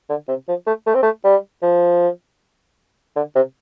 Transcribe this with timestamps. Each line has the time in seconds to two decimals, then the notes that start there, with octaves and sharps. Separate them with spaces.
0.09 D3
0.28 C3
0.48 F3
0.67 A3
0.87 A3
0.95 C4
1.03 A3
1.24 G3
1.62 F3
3.16 D3
3.35 C3